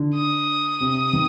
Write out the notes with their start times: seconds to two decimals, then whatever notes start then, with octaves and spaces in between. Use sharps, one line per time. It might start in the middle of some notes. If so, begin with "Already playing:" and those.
Already playing: D3
0.15 D#6
0.80 C3
1.13 D#3